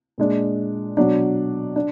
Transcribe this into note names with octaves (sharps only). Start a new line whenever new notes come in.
A#2 G#3 D4
B2 F#3 D4
D4